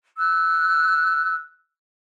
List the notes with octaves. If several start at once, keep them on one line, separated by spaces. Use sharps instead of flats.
E6 F#6